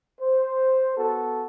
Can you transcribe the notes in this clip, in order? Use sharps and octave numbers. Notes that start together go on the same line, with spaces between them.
C5
B3 F#4 A4